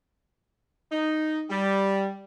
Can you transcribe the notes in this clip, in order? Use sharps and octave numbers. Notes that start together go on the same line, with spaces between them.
D#4
G3